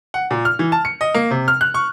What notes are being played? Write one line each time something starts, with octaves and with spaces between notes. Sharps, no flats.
F#5
A#2
F6
E3
A5
C#7
D#5
A#3
C3
F6
F#6
C#6